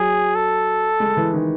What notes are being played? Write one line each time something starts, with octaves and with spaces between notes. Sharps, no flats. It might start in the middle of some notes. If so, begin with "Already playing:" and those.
Already playing: F#3 G#4
A4
G#3
E3
D#3